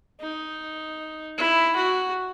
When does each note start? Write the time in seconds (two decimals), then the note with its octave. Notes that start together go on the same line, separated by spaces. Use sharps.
0.20 D#4
1.38 E4
1.76 F#4